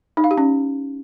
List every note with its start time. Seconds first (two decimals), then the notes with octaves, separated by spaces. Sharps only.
0.17 D#4
0.24 F5
0.31 G4
0.38 C#4